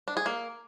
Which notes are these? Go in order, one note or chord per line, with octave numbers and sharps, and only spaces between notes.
D4
G#4
A#3